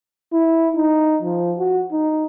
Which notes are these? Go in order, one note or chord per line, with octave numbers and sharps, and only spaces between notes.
E4
D#4
F3
F#4
D#4